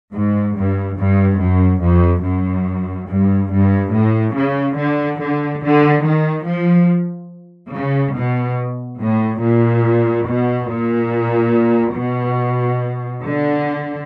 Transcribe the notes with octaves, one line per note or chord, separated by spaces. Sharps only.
G#2
G2
G2
F#2
F2
F#2
G2
G2
A2
C#3
D3
D3
D3
D#3
F3
C#3
B2
A2
A#2
B2
A#2
B2
D3